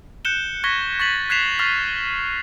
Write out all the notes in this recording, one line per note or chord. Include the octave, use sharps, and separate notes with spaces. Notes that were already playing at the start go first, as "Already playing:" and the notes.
F#6 G6 C#7 E7 G7
C#6 F#6 G#6 A#6 B6 G7
C#6 A6 B6 F#7
F#6 G#6 B6 C7 E7 F7
C#6 F6 A6 C7 F7